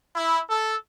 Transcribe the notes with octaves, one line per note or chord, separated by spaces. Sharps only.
E4
A4